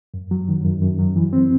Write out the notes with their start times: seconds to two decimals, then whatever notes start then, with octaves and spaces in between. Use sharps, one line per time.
0.14 F#2
0.31 F#3
0.49 D#3
0.65 F#2
0.82 F#2
0.99 F#3
1.16 E3
1.33 C4